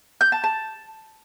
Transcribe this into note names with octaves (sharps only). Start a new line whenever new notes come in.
G6
A5
A5